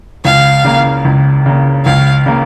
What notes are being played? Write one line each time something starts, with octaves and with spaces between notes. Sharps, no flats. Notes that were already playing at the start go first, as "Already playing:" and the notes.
C#2 F5
C#3 A#3
C#2
C#3 A#3
C#2 F5
C#3 A#3